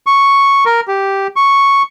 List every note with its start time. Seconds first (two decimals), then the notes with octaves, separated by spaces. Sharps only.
0.07 C#6
0.66 A#4
0.88 G4
1.36 C#6